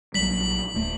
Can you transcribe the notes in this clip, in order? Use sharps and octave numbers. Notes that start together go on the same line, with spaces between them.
A#1 F#3 G3 B6 F#7
D1 A3